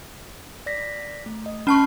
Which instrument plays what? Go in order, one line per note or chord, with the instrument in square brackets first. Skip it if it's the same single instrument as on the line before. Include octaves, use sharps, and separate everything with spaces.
[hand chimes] D5 A#6 B6
A3
D#5
[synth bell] C#4 A5 C#6 [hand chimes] B5 F6 C7